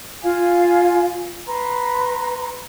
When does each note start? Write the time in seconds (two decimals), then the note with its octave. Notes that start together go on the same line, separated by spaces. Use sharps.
0.22 F4 F5 G#5
1.47 B4 A#5 C6